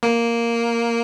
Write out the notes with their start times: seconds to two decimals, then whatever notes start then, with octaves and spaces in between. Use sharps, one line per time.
0.03 A#3